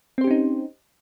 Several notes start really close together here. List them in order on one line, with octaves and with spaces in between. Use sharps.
C4 C5 G4 C#4 D#4